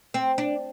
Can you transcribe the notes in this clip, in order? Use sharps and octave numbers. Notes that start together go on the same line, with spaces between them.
C4
D4